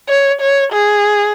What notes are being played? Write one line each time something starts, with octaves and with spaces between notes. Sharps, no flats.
C#5
C#5
G#4